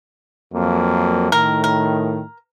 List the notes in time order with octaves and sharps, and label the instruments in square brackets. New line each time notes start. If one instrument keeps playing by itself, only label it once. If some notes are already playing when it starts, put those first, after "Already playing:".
[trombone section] F2 F#3 A#3
[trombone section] A2 D#3 [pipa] A#4
[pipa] A#4